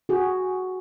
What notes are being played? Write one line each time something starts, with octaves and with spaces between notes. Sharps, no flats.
F#4 G#4